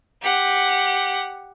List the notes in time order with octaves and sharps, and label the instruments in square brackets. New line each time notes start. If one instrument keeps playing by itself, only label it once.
[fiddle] G4 F#5